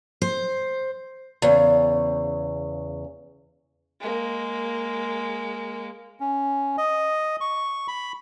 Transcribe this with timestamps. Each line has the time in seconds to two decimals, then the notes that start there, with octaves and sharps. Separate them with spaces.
0.22 C5
1.42 E2 C#3
4.00 G#3 A#3
6.20 C#4
6.78 D#5
7.41 C#6
7.88 B5